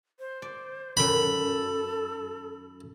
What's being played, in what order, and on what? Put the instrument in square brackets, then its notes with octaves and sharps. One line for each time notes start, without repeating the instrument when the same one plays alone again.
[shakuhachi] C5
[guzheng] D5
[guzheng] F#2 D#3 [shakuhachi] A4 [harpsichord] B5